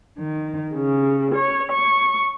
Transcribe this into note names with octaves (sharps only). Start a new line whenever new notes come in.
D#3
C#3
C#5
C#6